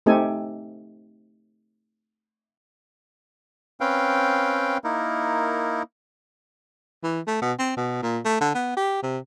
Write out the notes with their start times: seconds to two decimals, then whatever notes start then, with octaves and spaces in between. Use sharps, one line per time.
0.06 A3 C4 D#4 G4 A4 G#5
3.81 C4 C#4 B4 F5 G5
4.84 A#3 D#4 E4 A#4
7.03 E3
7.27 A3
7.42 B2
7.59 C4
7.77 B2
8.02 A#2
8.25 A3
8.41 D3
8.55 B3
8.77 G4
9.03 C3